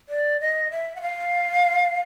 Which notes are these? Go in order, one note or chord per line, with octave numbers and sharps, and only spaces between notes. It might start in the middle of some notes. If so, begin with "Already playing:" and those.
D5
D#5
E5
F#5
F5